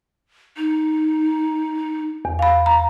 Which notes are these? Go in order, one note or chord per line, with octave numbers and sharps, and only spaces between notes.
D#4
E2
F5 B5
A#5